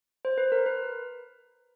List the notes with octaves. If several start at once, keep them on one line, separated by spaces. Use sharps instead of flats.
C5
B4
A#4
B4